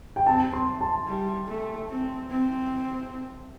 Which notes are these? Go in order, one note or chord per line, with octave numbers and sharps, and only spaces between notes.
G5
C4 A5
C6
A5
G3
A3
C4
C4